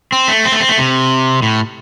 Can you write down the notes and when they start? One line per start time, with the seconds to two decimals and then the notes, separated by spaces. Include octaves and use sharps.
0.12 C4
0.28 A3
0.45 C4
0.52 A3
0.60 C4
0.69 A3
0.78 C3
1.42 A2